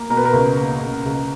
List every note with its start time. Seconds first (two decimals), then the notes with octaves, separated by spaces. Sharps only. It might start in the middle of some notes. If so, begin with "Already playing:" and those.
Already playing: A#3
0.10 B2 A#4
0.17 B4
0.25 A#4
0.33 C#2
0.58 A#3
0.81 C#2
1.05 C#2